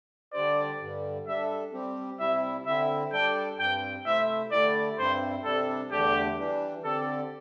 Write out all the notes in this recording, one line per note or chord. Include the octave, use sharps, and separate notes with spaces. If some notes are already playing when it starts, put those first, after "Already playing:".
D3 G3 D4 G4 C5 D5
G2 D3 G3
G3 D4 A4 E5
G3 C4 G4
C3 G3 E4 E5
D3 C4 E4 E5
G3 D4 A4 D5 G5
G2 G3 C4 G5
C3 A3 E4 C5 E5
D3 A3 E4 G4 D5
G2 G3 C4 E4 C5
C3 G3 D4 A4
E2 D3 A3 D4 G4
E3 G3 D4
D3 C4 G4 A4 D5